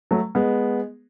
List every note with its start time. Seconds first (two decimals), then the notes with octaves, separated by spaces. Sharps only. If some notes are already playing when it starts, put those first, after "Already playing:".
0.11 F#3 A3
0.35 G#3 B3